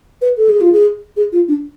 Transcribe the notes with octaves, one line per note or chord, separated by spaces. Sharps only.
B4
A4
G#4
F4
G#4
G#4
F4
D4